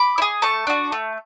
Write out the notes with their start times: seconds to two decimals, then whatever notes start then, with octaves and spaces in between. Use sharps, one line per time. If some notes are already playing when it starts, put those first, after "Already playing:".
Already playing: B5 D6
0.18 E4
0.22 G#4
0.42 A3 A5 C#6
0.67 D4 F#4
0.92 A3